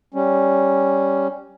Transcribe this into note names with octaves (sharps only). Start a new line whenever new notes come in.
G3 C#4